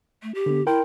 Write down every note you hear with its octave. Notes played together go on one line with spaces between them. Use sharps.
A3
G4
D3 B3
E4 A#4 G5 C6